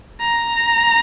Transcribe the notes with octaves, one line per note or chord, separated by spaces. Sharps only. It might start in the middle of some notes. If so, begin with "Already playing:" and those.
A#5